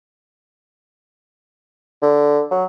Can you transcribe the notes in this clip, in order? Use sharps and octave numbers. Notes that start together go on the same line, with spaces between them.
D3
F#3